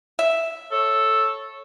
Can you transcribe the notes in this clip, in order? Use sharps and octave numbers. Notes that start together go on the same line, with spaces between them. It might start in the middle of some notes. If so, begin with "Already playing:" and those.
E5
A4 C#5